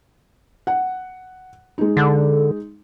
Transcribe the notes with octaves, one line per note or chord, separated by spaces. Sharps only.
F#5
G#3 D#4
D3